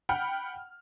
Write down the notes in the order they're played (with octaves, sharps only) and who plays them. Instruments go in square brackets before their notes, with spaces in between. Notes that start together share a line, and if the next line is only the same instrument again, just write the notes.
[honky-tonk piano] F#5 G5 B5 F6